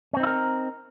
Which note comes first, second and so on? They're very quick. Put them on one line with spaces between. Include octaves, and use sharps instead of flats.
C#4 C4 D#4 E4 A#4